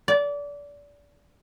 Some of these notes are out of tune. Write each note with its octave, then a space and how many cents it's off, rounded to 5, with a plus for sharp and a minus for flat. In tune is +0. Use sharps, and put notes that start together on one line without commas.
D5 -25